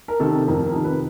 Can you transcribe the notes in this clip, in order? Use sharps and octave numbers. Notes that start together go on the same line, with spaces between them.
A#4
C3 D#3 A4
F2 A#4
A#4
C3 D#3
B4